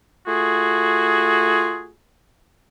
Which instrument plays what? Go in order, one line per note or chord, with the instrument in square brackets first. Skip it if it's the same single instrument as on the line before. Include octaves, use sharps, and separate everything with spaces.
[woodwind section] A3 F4 F#4 G#4